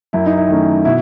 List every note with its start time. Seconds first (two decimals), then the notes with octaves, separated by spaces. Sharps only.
0.13 F#2 E4
0.26 D#4
0.37 E4
0.49 D#3 A3 C#4
0.85 B2 E4